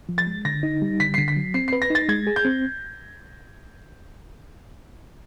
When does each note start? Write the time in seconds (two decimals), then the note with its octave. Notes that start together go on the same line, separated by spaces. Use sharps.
0.09 F3
0.18 A6
0.27 G#3
0.45 D3 A#6
0.63 D#4
0.82 G3
1.00 D3 B6
1.14 D3 C7
1.28 B6
1.36 F#3
1.54 C4 C7
1.68 C7
1.73 B4
1.82 A#6
1.90 D#4 A6
2.09 G#3 G#6
2.27 G#4
2.36 G6
2.45 C4